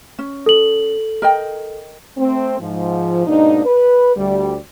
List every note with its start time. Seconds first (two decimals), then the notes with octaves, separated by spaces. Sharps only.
0.19 C#4
0.46 A4 F#7
1.22 A#4 D#5 G5
2.18 A3 C4
2.60 G#2 F3
3.26 G#2 B2 A#3 D4 D#4
3.66 B4
4.16 D2 G3